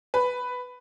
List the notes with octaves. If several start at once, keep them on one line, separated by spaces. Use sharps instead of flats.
B4